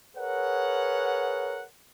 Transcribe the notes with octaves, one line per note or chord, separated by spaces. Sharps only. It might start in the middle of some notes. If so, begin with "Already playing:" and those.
G#4 A#4 B4 C#5 F#5